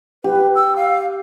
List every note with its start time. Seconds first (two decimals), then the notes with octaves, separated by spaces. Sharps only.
0.24 G4 B4
0.55 E6
0.76 F5